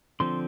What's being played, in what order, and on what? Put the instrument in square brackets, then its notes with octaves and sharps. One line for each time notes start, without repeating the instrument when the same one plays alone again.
[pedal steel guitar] D3 F3 C4 C6